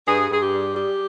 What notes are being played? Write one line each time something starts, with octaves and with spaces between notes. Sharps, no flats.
G2 G#4
G2 G#4
G4
G3
G3 G4